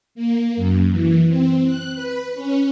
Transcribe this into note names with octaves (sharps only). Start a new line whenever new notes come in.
A#3
F#2
E3
C4
F#6
B4
C#4